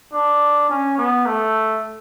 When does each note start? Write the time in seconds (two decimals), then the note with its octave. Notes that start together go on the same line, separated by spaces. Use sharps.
0.13 D4
0.70 C#4
0.98 B3
1.26 A3